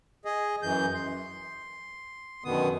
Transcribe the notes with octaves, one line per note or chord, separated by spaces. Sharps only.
G#4 D#5
F#2 E3 G6
C6
F#2 B2 D3 D#3 B3 D#6